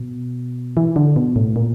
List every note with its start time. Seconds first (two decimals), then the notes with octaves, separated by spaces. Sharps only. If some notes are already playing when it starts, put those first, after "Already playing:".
Already playing: B2
0.77 E3
0.96 D3
1.16 B2
1.36 A2
1.56 A#2